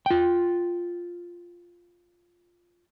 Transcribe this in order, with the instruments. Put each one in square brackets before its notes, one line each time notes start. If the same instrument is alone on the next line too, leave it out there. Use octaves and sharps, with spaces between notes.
[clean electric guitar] F4 G5